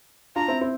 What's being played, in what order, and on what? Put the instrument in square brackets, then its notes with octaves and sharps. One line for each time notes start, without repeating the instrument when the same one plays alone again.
[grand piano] D4 F4 [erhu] A#5
[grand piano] C4 E4
C4 E4